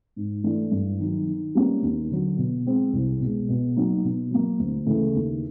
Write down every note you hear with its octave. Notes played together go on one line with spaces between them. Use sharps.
G#2
E3 A3 D4
G2
D#3 F#3
D#3
G3 A#3 C#4
D#2
D3 F#3
B2
G#3 C4
C2
B2 G#3
B2
F#3 A#3 D#4
B2
F#3 A#3
D2
C#3 E3 A3
D#2